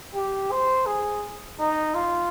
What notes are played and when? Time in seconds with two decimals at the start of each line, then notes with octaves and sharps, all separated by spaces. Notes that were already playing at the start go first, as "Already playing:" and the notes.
0.14 G4
0.51 C5
0.86 G#4
1.59 D#4
1.94 F4